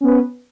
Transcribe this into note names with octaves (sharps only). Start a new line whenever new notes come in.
B3 C#4 B4